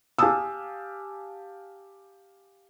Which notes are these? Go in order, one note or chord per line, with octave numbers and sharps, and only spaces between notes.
G4 F5 G#5 A5 D#6 E6